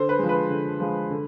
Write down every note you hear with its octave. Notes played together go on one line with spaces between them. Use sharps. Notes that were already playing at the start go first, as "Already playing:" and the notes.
Already playing: D3 C5
B4
F3 G#3
B4
D3
F3 G#3
D3